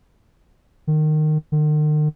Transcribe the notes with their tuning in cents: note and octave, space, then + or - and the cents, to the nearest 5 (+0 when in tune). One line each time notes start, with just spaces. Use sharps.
D#3 -20
D#3 -45